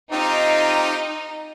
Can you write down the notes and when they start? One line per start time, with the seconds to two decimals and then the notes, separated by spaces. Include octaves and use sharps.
0.12 C4 D#4 F4 G4